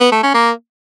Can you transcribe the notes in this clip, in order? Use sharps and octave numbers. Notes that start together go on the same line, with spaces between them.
B3
A3
C#4
A#3